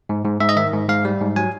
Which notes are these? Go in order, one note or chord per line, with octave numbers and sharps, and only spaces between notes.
G#2
G#2
G#2 E5
D#5
D#3 E5
G#2
G#2 F5
G3
G#2
F#3 G#5